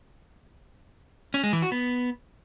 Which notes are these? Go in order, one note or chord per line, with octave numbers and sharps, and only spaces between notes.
C#4
G#3
E3
F#4
B3